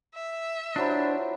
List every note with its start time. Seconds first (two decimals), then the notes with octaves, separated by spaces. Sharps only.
0.14 E5
0.76 F3 F#3 D4 E4 C5